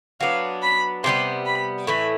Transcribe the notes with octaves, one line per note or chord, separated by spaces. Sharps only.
F#3 B3 D4 F5
B5
C3 E3 G3 B3 C6
B5
A2 E3 A3 B5